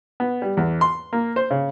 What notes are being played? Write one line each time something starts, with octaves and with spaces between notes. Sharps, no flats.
B3
G3
E2
C6
A#3
C5
C#3